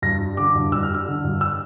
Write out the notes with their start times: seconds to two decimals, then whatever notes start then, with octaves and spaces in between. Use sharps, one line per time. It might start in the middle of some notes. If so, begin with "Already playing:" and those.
0.02 G2 A#6
0.20 G3
0.37 D3 D6
0.55 G2
0.72 G2 E6
0.83 F6
0.89 G3
0.94 E6
1.06 D3
1.24 G2
1.41 E6